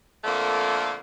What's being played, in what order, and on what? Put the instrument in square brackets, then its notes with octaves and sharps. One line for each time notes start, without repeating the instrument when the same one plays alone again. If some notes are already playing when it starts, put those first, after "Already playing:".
[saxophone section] F2 D3 A3 A#3